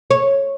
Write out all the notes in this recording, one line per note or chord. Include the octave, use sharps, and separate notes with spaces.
C#5